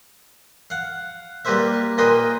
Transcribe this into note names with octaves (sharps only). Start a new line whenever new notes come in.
F5 F#5
G3 A#3 G4 B4 C5 E5
A#2 A#3 B4 D#5 G5 C6